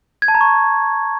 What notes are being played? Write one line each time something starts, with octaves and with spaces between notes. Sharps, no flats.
G#6
A5
A#5
C#6